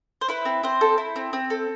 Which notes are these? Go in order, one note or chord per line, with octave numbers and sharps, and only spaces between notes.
C5
E4 B4
C4
C4 C5
A4
E4
C4
C4
A4